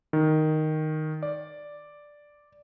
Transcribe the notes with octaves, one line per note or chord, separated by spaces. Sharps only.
D#3
D5